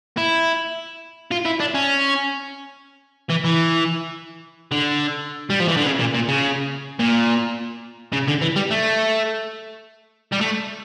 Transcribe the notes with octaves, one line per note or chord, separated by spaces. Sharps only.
E4
F4
E4
D4
C#4
E3
E3
D3
G3
F3
E3
D3
C#3
A#2
A#2
C#3
A#2
C#3
D3
E3
G3
A3
G3
A3